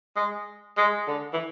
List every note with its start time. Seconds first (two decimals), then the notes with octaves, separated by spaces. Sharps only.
0.16 G#3
0.77 G#3
1.07 D3
1.33 E3